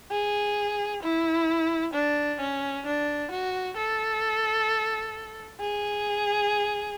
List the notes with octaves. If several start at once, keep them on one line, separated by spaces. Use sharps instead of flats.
G#4
E4
D4
C#4
D4
F#4
A4
G#4